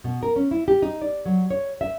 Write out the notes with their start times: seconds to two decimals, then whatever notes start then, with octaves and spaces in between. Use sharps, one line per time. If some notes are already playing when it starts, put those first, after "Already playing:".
0.04 B2
0.23 A#4
0.36 C#4
0.51 E4
0.68 G4
0.82 D#4
1.02 D5
1.26 F#3
1.51 C#5
1.81 E5